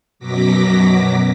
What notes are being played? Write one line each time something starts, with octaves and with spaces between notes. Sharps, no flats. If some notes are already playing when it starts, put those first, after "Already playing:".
F#2 B2 F#3 D6 A#6 B6